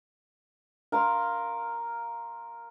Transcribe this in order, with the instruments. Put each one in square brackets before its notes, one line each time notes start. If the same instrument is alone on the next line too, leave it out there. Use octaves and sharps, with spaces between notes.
[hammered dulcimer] A#4 F5 C6